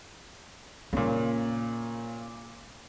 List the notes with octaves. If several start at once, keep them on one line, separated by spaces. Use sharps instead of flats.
A#2 C#3 A#3